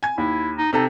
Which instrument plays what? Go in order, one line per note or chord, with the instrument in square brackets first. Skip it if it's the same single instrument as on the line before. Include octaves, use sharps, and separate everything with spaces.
[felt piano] G#5 G#6
[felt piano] D#2 [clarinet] E4
[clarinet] D#4
[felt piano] C3 A4 A5 [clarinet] D#4